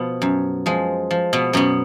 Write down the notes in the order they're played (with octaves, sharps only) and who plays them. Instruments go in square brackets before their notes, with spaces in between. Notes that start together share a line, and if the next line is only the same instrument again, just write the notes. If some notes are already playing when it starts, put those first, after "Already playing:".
Already playing: [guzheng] B2 F3 B3
F#2
F3 G#3
F3
B2 B3
F#2 B2 B3